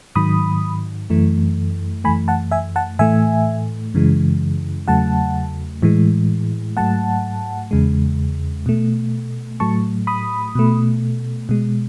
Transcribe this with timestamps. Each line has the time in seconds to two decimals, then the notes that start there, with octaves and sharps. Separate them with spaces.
0.16 G#2 D#3 F#3 B5 D#6
1.10 F#2 E3 A3
2.04 F#2 E3 A3 G#5 B5
2.28 F#5 A5
2.52 E5 G#5
2.76 F#5 A5
2.99 A2 E3 A3 E5 G#5
3.94 F#2 C#3 E3 G#3
4.88 E2 C#3 F#3 A3 F#5 A5
5.82 A2 E3 G#3
6.77 G#2 F#3 A3 F#5 A5
7.71 E2 C#3 G#3
8.66 B2 A3
9.60 A2 F#3 A3 A5 C#6
10.07 B5 D#6
10.55 B2 A3
11.49 B2 G#3